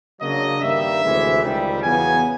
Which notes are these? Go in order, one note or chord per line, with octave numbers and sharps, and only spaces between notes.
C#3 F#3 A#3 D4 D#5
G2 D#3 G3 A#3 E5
D2 C3 E3 G#3 C#4
C#2 C3 D#3 G3
E2 C#3 F#3 B3 G#5